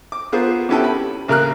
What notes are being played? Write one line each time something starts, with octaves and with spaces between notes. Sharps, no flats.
D6
B3 F4 G#4 A#4 C5
C3 B3 C#4 E4 G4 A4
B5
A1 C#3 A#3 A#4 F6 F#6